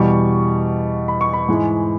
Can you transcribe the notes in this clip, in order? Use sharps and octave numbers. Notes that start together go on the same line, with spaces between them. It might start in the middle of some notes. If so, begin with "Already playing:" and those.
Already playing: E2 B2 G3 C#6
B5
C#6
B5
G#2 E3 G#3